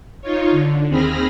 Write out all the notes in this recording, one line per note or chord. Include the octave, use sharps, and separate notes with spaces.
D#4 F4 C#5
D3
D#2 C4 G#4 B5 F6 A#6